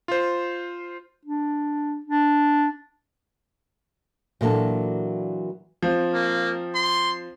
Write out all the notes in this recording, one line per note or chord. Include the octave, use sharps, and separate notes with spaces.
F4 C5
D4
D4
A#2 E3 F#3 A#3 D4 A4
F3 C4
A#3
C6